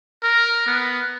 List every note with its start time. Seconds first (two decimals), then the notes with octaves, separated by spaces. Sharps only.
0.23 A#4
0.66 B3